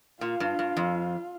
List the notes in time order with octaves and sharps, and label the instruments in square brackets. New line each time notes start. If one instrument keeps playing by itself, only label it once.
[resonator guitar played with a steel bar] A#2 [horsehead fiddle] F4
[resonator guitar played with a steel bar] G2
G2
F2